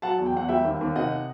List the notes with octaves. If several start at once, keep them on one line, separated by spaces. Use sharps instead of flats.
F#3 F#5 A5
E2
G5
E2 F#5
G3 E5 G5
D#2
D#2
C3 D#5 F#5